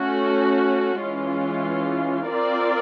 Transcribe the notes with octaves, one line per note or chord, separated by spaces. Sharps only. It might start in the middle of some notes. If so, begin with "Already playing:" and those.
Already playing: A3 C#4 F#4
E3 G#3 C#4 F4
C4 F4 A#4 D5